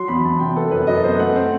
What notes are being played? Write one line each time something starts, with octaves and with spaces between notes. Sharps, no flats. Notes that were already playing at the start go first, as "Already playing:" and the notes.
Already playing: F#3 C6
E2 B5
E2 A5
C3 G5
B3 A4
F#2 B4
F#2 D#5
B3 C5
A3 F#5
C4